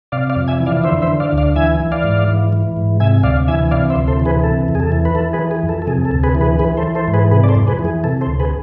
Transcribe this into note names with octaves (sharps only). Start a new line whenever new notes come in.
C3 D5 F5
D5 F5
F2
E5 G#5
E3
D5 F5
D3 C5 E5
C5 E5
D3
D5 F5
D2
D5 F5
E3 E5 G#5
E3
D5 F5
G#2
E3
E3
G#2
C3 E5 G#5
D2 D5 F5
E3 E5 G#5
C3 D5 F5
C5 E5
D2
A4 C5
E3
G#4 B4
C3 A4
E2
G#4
A4
E3
B4
E3 A4
G#4 B4
E3
G#4
F2
A4
A4
C3 G#4
A4
D2
G#4 B4
E3
G#4 B4
E3 G#4 B4
A4 C5
E3
A4 C5
G#2
G#4 B4
C3 G#4 B4
D5
A4 C5
F2
G#4 B4
E3
G#4
C3 A4
A4 C5
D2
G#4 B4